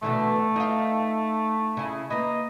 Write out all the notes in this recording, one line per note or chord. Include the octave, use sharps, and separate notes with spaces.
B2 D3 E3 A3
D#4 F4
C#3 E4
A#3 B4 D#5